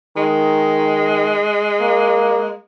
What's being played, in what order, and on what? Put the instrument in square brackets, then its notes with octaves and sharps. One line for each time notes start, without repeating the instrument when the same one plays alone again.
[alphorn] D#3 [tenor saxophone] G#3
[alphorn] A#3